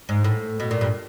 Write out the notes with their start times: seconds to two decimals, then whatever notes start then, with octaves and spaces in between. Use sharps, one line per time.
0.09 G#2
0.24 A2
0.60 B2
0.71 A#2
0.81 G2